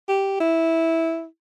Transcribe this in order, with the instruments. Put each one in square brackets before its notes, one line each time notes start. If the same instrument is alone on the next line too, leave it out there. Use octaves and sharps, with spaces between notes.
[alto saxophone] G4
E4